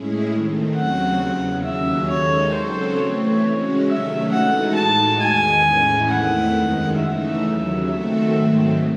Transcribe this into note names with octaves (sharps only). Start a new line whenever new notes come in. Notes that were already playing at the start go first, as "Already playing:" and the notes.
Already playing: A2 G#3 C#4 E4 G#4
D#3 A3 C4
D#2 C#3 F#3 C4 F#4 F#5
E2 C#3 F#3
D#2 C#3 F#3 C#4 E5
D#2 D#3 G#3 D#4 A4 C#5
C#3 F#3 C4 F#4 A4 C5
E3 A3 C4 C#5
C#3 G#3 C#4 F#4
C3 D#3 F#3 A3 C#4 E5
E3 G#3 D#4 F#4 A4 F#5
A2 G#3 D#4 F#4 A5
E2 D#3 G#3 G#5
A2 E3 G#3 C#4 E4
E2 D#3 A3 C4 E4 F#5
F#2 D#3 G#3
C#3 E3 A3 D#4 E5
D#2 C#3 F#3
D#3 A3 C4 F#4 A4 E5
G#2 D#3 F#3 A3 C4